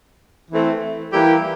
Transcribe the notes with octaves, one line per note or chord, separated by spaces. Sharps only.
E3 A3 C4
E3 G3 A#3 E4 G4